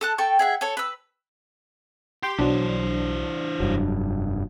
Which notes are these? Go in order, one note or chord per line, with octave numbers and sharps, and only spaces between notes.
A4 A5 F#6
A4 G5 C#6
G#4 E5 F#5
A4 C#5
B4 E6
G4 G5 C6
B1 E3 F#3 D4 C5
F1 G2 F#3